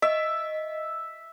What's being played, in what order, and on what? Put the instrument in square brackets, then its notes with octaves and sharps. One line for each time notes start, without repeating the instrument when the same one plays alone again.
[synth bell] D#5 [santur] E5